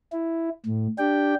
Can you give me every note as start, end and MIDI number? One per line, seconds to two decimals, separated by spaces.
0.12 0.49 64
0.66 0.87 45
0.99 1.35 62
0.99 1.35 67
0.99 1.35 79